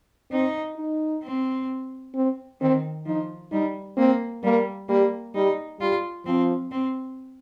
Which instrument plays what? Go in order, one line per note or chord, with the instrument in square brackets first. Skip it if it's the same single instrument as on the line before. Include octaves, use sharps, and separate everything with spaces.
[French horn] C4 [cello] D#4
[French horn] D#4
[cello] C4
[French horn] C4
[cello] D#3 [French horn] C4
[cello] F3 [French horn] D#4
[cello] G3 [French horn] D#4
[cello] A#3 [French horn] C4
[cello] G3 [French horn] A#3
[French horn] G3 [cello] A#3
[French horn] G3 [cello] D#4
[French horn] G3 [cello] F4
[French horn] F3 [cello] C4
[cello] C4